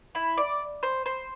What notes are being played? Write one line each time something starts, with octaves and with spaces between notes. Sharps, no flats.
E4
D5
C5
C5